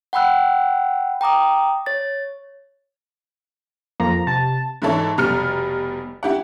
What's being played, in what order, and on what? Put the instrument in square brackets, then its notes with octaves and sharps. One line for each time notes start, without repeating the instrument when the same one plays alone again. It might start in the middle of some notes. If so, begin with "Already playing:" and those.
[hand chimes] F#5 G5 B5 E6 F#6
G5 A#5 D6 D#6
C#5 A6
[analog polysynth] F2 F3 A#3 [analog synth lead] A#5
[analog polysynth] C3 [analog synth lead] A5
[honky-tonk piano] G#2 E3 E4 A4 C#5
F1 B2 G3 A#5 F6 C#7
E4 G4 F#5